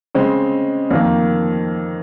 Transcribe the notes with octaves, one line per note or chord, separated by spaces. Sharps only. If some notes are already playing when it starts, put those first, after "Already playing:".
C#3 G#3 C4
F2 D#3 A#3